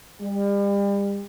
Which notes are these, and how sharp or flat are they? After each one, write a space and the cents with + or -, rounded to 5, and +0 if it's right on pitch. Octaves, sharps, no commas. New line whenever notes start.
G3 +35